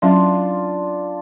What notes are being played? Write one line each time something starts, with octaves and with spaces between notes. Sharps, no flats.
F#3 C#4 D4 F4 E5